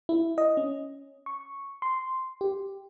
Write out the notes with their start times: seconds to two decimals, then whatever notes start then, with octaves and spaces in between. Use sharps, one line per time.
0.09 E4
0.38 D#5
0.57 C#4
1.26 C#6
1.82 C6
2.41 G4